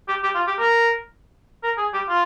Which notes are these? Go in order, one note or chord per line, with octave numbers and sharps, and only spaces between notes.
G4
G4
F4
G4
A#4
A#4
G#4
G4
F4